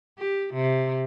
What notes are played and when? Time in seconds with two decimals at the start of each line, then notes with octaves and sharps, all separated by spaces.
0.18 G4
0.54 C3